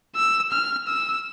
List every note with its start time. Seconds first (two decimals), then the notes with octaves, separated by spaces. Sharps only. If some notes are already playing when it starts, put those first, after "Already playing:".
0.16 E6
0.52 F6
0.88 E6